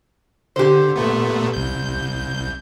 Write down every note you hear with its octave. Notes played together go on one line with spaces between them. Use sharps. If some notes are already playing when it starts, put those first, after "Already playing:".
D3 G4 C5
A#2 A3 B3
C2 G6